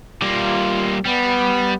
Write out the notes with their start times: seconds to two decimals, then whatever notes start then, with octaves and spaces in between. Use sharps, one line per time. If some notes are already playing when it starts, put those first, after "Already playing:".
0.22 G3 A#3 F4
1.05 G3 B3